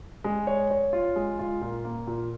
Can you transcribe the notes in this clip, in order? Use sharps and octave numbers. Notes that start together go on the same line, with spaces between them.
G#3
C#5
C#5
F4
G#3
F4
A#2
A#3
A#2